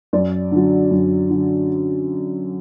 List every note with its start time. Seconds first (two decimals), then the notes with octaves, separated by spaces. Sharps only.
0.13 F#2 D5
0.51 D3 F#3
0.91 F#2
1.29 D3 F#3